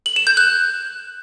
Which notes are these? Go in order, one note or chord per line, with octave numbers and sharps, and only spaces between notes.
F#7
E7
G6
F#6